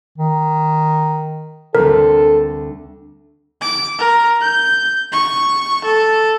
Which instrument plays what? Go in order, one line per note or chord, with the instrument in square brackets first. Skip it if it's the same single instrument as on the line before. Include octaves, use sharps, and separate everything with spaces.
[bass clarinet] D#3
[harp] D2 G3 C4 [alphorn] A4 [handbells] A#4
[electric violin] D6
A#4
G6
C#6
A4